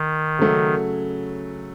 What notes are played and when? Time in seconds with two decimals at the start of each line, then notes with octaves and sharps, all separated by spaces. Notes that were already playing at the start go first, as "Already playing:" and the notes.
Already playing: D#3
0.39 C#3 F#3 A3 C#4